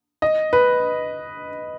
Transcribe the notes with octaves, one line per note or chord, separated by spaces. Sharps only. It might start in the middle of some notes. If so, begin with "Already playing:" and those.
D#5
B4